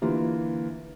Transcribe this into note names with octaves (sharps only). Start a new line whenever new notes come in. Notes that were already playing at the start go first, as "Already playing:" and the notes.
D3 E3 A#3 F4